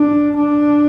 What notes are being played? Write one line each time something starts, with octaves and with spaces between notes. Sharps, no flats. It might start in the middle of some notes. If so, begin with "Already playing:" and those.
Already playing: D4
D4